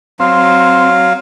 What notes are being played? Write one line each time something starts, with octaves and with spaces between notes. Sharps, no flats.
F#3 C4 F5